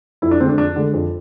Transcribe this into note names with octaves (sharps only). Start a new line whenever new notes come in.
F2 E4
D4
D3 G#3 C4 D4
F2 D4
D3 G#3
F2